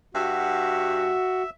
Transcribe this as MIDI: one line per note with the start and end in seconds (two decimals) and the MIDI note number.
0.15 1.14 43
0.15 1.43 66
0.15 1.50 76